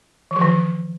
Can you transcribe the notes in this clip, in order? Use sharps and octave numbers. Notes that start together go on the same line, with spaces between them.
E3
F3
D#3